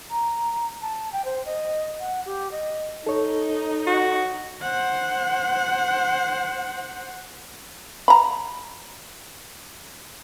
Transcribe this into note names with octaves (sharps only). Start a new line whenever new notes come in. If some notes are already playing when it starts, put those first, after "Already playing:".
A#5
A5
G5
C5
D#5
F#5
G4
D#5
D#4 A4 C#5
F#4
C5 F#5
A#5 B5